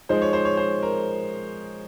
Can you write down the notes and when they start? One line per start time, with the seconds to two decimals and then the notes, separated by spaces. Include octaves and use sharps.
0.09 F3 G#3 D#4 C5
0.22 C#5
0.33 C5
0.45 C#5
0.57 C5
0.83 A#4